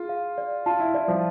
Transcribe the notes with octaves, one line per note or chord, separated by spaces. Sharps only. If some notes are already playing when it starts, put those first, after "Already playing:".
Already playing: F4 G#4
F5
D5
F4 A5
E4
E4 D5
F3